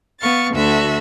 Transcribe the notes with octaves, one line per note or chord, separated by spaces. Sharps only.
B3 F5 C#6 A6
D2 D3 F#4 A4 E5